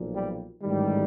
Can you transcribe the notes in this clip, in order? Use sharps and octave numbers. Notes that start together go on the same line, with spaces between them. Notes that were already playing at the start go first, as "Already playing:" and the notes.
Already playing: B1 A#2 F3
G3
A1 G#2 D#3 G3